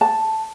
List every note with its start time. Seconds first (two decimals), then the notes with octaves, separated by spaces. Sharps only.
0.01 A5